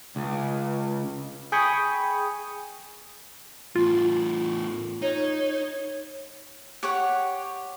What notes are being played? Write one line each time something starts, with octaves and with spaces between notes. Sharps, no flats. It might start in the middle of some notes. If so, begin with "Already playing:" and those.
C#2
G#4 G5 G#5 B5 C#6 D#6
E2 A2 F4
D#4 C#5
G4 C#5 F#5